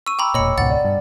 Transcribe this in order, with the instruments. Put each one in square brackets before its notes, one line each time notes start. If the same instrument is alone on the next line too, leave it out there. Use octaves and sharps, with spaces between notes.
[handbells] C#6 [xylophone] E6 D#7
[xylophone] G5 A#5 B5 [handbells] D6 E6
[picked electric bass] E1 A#2 [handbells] C#5 [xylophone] D#5 B5 C#7
[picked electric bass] C#2 G#2 B2 [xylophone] F#5 A6
[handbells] D5
[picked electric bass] G2